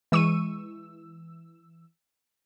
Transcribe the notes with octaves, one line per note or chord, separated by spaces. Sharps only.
E3 G#3 C#6 E6 D#7